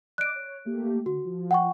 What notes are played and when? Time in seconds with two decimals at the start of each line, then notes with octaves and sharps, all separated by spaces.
0.18 D5 D#5 D6 F#6 D7
0.35 C#5
0.65 A3 A#3 G4
1.06 D3 F#4
1.25 F3
1.51 F#5 G5 C#6